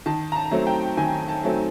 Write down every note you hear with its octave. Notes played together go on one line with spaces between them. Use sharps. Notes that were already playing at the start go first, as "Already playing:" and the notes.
D#3 A5
A#5
A5
F#3 A3 C4
G5
D#3 G#5
A5
F#3 A3 C4